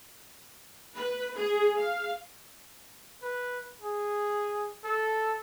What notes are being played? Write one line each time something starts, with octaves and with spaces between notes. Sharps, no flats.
B4
G#4
F5
B4
G#4
A4